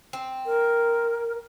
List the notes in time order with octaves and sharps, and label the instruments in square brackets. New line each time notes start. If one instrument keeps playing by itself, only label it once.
[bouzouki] C4
[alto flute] A#4